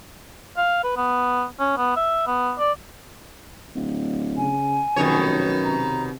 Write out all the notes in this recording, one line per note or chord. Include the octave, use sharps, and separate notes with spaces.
F5
B4
B3
C#4
B3
E5
B3
D5
D1
C#3 G#5
F1 F#2 B2 D#3 C#5
C3 A#5